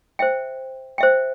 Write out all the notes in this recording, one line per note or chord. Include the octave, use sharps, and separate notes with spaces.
C5 E5 G5
C5 E5 G5